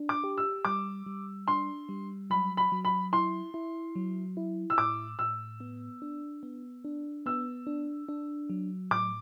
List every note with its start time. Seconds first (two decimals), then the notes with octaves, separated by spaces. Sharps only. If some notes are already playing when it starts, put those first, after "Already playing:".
Already playing: D4
0.09 D6
0.24 G4
0.38 E6
0.65 G3 D6
1.06 G3
1.47 D4 C6
1.89 G3
2.30 F#3 B5
2.57 B5
2.72 F#3
2.85 B5
3.13 E4 C6
3.54 E4
3.95 F#3
4.37 E4
4.70 E6
4.78 A2 D6
5.19 A2 E6
5.60 B3
6.02 D4
6.43 B3
6.84 D4
7.26 B3 E6
7.67 D4
8.08 D4
8.50 F#3
8.91 A2 D6